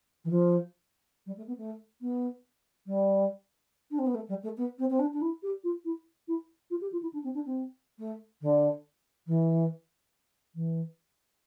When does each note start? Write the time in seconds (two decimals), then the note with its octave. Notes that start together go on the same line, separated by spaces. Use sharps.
0.24 E3
0.30 F3
1.26 G3
1.37 A3
1.47 B3
1.57 A3
2.01 B3
2.86 G3
3.91 D4
3.98 C4
4.06 B3
4.14 A3
4.28 G3
4.43 A3
4.57 B3
4.78 C4
4.90 C4
4.99 D4
5.13 D4
5.21 E4
5.43 G4
5.63 F4
5.85 E4
6.28 E4
6.70 F4
6.81 G4
6.92 F4
7.02 E4
7.13 D4
7.24 C4
7.34 D4
7.45 C4
7.98 A3
8.41 D3
9.27 E3
10.54 E3